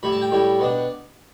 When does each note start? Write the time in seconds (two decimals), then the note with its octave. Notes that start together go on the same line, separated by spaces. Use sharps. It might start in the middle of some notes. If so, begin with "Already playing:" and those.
0.03 A2 G3 E4 B5
0.12 A5
0.21 G5
0.31 A2 G3 E4
0.59 B2 B3 D4